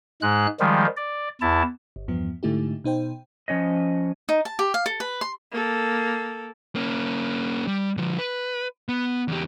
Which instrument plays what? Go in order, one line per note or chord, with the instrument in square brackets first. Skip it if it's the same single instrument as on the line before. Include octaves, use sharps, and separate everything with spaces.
[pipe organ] G#2 G#3 F#6
D#3 F3 G3 G#3
D5
E2 E4 A5
[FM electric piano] G1
E2 G2 F3 B3
G#2 D3 A3 D#4 E4 G4
B2 D#4 C5 G5
[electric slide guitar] F3 C#4 C#5 D#5
[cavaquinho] D#4
A5
G4
F5
A4
B4
C6
[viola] A#3 A4
[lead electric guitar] A#3 C#4
G3
D3 F3
B4
B3
E2 G4